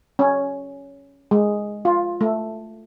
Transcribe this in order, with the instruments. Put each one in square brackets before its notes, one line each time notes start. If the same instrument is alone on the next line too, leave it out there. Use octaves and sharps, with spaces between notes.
[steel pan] C#4
G#3
F4
A3